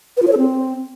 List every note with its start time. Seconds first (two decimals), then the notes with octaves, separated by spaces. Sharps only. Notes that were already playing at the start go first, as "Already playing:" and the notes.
0.17 B4
0.22 F4
0.27 C#5
0.33 A4
0.38 C4